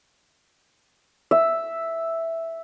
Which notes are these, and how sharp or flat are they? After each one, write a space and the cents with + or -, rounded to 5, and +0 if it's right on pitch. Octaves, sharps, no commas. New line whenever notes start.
E5 +0